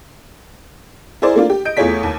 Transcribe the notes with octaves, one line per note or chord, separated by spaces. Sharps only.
E4 G#4 A#4 C5 D5
A3 A#3 D4 F4
G4
D#5 G6 D7
E2 A3 F4 G#4 C#5 B6
D#2